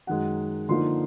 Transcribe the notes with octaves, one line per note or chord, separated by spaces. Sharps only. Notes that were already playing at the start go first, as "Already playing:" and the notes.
F#2 D#3 G#3 F#5
D3 F3 A#3 D#4 C6